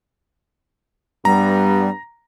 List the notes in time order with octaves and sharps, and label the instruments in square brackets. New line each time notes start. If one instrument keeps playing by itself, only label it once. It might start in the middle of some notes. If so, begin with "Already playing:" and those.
[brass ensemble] G2 B3 [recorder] G3 [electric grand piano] A#5